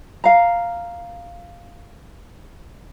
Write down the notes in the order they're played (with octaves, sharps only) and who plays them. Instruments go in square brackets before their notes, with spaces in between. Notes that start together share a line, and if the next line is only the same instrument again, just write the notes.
[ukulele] F5 A#5